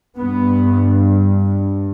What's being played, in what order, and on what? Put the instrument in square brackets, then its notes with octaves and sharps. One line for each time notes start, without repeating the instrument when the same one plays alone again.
[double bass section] G2 B3